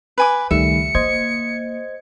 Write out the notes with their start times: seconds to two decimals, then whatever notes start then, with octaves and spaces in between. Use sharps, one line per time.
0.18 B4 G#5 D6
0.51 C#2 D#3 G3 A3 E5 C#7
0.95 A#3 C5 D#5 G#6